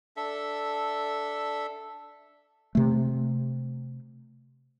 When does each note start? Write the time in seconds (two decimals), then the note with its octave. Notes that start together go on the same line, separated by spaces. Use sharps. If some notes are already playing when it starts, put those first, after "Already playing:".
0.17 D4 A4 E5
2.75 C3 A3